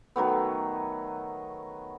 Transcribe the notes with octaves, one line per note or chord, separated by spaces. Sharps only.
D#3 F#3 A3 B3